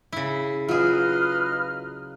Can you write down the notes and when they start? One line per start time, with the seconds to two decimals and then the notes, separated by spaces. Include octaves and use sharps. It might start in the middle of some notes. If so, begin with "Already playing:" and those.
0.13 C#3 E4
0.69 F#3 F4 G#4 B4 D#5 F5 F6